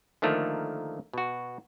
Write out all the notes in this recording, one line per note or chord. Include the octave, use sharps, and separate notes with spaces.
D3 D#3 F3 A3 A#3 A#4
B2 F#4